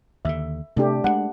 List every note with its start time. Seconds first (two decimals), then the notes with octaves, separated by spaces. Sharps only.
0.25 D#2 D3 E5
0.77 C3 A3 D4 G4
1.04 G#3 A#3 D4 F#5